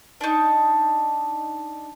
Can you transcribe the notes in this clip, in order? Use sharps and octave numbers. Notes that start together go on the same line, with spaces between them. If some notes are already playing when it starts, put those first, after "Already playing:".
D4 D#4